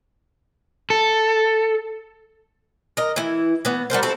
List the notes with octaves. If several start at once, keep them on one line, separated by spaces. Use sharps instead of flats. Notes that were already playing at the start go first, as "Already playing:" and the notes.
A4
A#4 D#5
E3 E4
E3 B3
G3 F#4 A#4 C5
C4 E4 F#4 A4